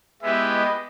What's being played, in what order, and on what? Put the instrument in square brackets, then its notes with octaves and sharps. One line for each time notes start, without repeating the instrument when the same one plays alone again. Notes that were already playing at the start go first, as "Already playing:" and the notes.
[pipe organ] G#3 B3 E4 G4 B4 [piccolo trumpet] E5
[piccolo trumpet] D#5